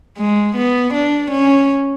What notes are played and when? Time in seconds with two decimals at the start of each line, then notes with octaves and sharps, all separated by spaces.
0.18 G#3
0.56 B3
0.93 D4
1.31 C#4